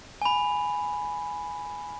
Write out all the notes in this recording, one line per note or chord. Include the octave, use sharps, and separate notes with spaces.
G#5 B5